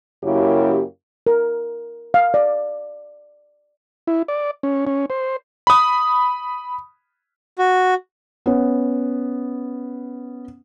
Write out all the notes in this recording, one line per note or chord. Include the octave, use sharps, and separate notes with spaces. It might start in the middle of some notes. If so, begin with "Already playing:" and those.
F#2 C#3 A#3 E4 G4
A#4
F5
D5
E4
D5
C#4
C#4
C5
B5 D#6
F#4
B3 C#4